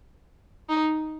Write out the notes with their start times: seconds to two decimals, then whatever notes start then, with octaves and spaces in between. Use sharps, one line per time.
0.69 D#4